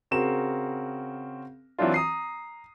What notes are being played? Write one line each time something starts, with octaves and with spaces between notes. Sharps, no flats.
C#3 C4 F#4 A#4 E7
E3 F#3 C4 D4 F4
A#5 D#6 C7